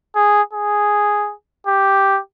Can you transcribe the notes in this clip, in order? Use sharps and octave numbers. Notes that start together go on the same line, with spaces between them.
G#4
G#4
G4